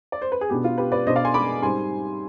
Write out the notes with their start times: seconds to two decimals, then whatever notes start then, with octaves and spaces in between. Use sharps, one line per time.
0.12 D5
0.22 C5
0.32 B4
0.41 G#4
0.49 B2 B3 D4 G4
0.64 F4
0.78 G4 B4
0.92 B4 D5
1.07 B2 B3 D4 C5 D#5
1.16 D5 F5
1.25 G#5 C6
1.34 B5 D6
1.62 G#2 G3 C4 G#5 C6